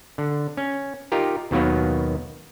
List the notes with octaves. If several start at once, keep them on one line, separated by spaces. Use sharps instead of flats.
D3
C#4
D#4 F4 G4 A#4
D#2 B2 D#3 F#3 A#3 B3